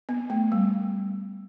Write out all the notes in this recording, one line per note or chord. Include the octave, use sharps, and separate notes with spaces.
B3
A3
G3